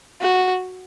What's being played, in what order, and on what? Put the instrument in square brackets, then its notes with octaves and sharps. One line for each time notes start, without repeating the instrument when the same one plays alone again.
[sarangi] F#4